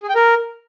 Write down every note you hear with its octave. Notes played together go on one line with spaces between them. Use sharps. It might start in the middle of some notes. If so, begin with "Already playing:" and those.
G#4
G5
A#4